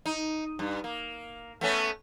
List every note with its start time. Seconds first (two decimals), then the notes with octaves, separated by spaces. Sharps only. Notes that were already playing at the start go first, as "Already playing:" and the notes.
0.06 D#4
0.59 G2
0.84 A#3
1.61 A3 B3 C#4